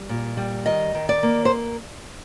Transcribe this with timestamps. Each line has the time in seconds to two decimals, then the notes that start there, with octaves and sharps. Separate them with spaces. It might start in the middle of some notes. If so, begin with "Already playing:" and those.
Already playing: G3
0.09 A#2
0.37 G3
0.66 D#3 D#5
0.95 D#3
1.09 D5
1.23 A#3
1.45 C5